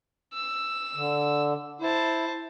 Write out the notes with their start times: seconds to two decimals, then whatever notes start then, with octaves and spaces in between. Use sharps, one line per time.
0.34 E6
0.95 D3
1.81 E4 C5 A5